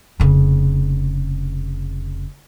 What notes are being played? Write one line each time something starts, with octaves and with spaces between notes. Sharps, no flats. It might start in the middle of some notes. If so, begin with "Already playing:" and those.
F1 C#3